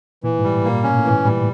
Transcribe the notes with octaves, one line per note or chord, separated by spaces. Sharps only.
A#2 E3
G#2
G3
A2
A#2 A#3
B2 C#4
A2 E3
G#2
G3
A#2